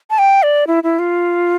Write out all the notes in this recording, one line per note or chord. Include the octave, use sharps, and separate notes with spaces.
A5
G5
D5
E4
E4
F4